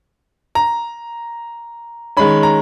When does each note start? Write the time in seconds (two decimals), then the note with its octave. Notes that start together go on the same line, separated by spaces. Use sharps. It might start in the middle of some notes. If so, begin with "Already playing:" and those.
0.55 A#5
2.17 D#3 G#3 C#4 B5
2.43 A#5